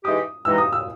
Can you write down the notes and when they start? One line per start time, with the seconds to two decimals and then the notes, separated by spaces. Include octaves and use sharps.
0.04 E3 G#3 D#4 G4 D#6
0.45 E3 G#3 D#4 G4 E6
0.58 D#6
0.73 E6